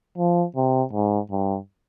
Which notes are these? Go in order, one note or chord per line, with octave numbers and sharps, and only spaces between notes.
F3
C3
G#2
G2